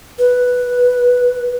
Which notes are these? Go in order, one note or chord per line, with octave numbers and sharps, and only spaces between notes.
B4